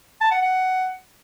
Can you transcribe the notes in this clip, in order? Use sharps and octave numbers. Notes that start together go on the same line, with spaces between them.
A5
F#5
F#5